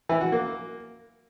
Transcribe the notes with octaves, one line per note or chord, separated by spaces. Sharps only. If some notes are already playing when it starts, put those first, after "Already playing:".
E3
F#4
A#3